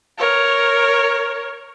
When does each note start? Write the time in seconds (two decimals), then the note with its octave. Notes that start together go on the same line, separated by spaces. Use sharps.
0.18 A#4 C#5